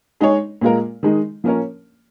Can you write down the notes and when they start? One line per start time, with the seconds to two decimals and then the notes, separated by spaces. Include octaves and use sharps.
0.21 G#3 D#4 G#4 C#5
0.61 A#2 G#3 F4 A#4
1.03 D#3 G#3 D#4
1.44 F3 A#3 C#4 A#4 C#5